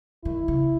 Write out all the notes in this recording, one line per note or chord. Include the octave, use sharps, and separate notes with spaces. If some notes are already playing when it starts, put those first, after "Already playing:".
D#3 E4
C#3